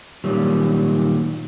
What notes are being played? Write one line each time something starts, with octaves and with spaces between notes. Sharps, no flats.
A#2 D#3 F#3 G3